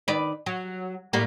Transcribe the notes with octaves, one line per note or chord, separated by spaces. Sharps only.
D#3 B4 D5
F#3
A2 G3 A#3